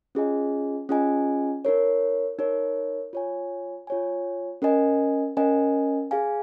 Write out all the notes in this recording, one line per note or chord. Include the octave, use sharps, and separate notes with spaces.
C#4 F4 G#4 D#5 G#5
C#4 F4 G#4 D#5 G#5
D#4 A#4 C#5
D#4 A#4 C#5
F4 C#5 G#5
F4 C#5 G#5
C#4 A#4 D#5 G#5
C#4 A#4 D#5 G#5
G#4 F5 G#5